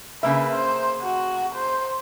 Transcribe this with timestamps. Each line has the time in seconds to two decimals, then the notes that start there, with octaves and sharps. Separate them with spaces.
0.23 C#3 A#3 B4 E5
0.55 C5
1.02 F#4
1.55 C5